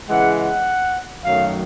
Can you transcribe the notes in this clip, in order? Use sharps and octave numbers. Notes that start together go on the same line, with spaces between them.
C#3 E3 G#3 F#5
F#5
F#2 D#3 F#3 A3 F5